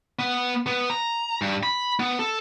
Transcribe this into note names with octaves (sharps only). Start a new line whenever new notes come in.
B3
B3
A#5
G2
B5
B3
A4